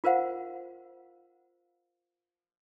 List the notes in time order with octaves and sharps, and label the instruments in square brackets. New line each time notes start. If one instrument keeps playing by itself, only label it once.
[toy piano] F4 A#4 C5 F5 F#5